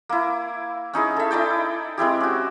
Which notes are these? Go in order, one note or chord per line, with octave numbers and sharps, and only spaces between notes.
A#3 E4
C#4 D#4 E4 G#4
A4 E5
D#4 E4 D5 G5
G#3 C4 E4 G4
C#4 F#4